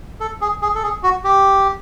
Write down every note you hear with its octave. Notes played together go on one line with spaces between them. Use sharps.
A4
G#4
G#4
A4
G#4
F#4
G4